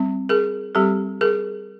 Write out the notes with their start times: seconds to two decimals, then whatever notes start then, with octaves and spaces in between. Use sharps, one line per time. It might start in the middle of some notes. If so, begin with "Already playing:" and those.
Already playing: G3 C4
0.29 G#4 A#4
0.75 G3 C4 G4 A4
1.21 G#4 A#4